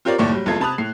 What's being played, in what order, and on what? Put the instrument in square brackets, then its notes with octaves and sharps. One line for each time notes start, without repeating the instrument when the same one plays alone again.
[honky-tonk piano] C4 F4 G4 A#4 C#5 D5
F#1 D#2 A2 D5 C#6
F#3 G3
F1 E2 G#3 F4 A4 G#6
C3 A5 B5 D#6 F#6 F7
A2 C7